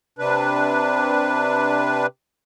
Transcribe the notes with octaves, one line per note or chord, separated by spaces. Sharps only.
C3 D4 B4